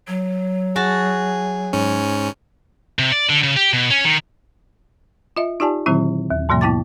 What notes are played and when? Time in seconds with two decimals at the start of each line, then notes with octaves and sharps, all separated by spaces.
0.07 F#3
0.76 F#4 G#4 A5
1.73 G#2 C#4
2.99 C3
3.12 D5
3.29 D3
3.43 C#3
3.57 G4
3.73 B2
3.90 C#4
4.05 D#3
5.37 F4 D#5 E5
5.60 D#4 F4 G4 D5 G#5 A5
5.86 A#2 D3 D#3 F#3 C4 E4
6.30 D#2
6.49 G#2 B2 E3 F#3 A#3
6.61 B3 E4 G5 A5 D6 A6